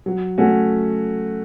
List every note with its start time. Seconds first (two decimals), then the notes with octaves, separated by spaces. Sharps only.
0.06 F#3
0.38 A3 C#4 F#4